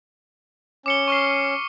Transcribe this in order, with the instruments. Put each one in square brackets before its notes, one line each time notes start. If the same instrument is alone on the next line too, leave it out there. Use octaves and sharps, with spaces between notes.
[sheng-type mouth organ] C#4 [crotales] D6 C#7 G7
[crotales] C#6 F6 C7